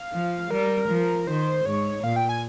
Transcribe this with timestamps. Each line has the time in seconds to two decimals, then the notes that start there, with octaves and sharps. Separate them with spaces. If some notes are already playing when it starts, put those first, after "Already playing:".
Already playing: F5
0.12 F3
0.51 G3 A#4
0.88 F3
1.27 D#3 C5
1.65 G#2 C#5
2.03 A#2 F5
2.16 G5
2.29 G#5